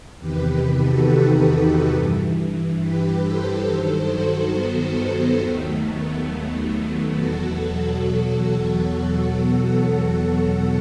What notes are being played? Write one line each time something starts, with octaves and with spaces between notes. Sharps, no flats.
E2 C3 D#3 G4 B4
G4 B4
F#4 A4
D#4 F#4
G2 E3
G4 B4
A4 C5
G2 D#3 F#3 A4 C5
F#4 A4
B3
D#2 D#3 F#3 A3
B3
E2 B2 F#3 F#4 A4
E2 B2 F#3